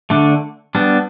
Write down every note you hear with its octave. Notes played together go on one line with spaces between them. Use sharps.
D3 A3 D4
G3 B3 D4